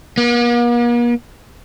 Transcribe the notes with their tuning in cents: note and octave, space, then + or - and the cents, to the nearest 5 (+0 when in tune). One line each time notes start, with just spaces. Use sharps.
A#3 +45